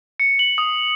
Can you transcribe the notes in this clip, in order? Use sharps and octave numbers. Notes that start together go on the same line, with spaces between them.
C#7
F#7
D#6